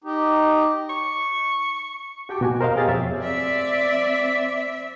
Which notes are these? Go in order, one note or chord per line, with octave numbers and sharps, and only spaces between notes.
D#4 G4
C#6
F#4 G4 G5 A5 D6
B2 F#4 G#5
A#4 C5 D#5 F5
B2 G4 G#4 F5 A6
F2 C#5 E5
C4 D5 E5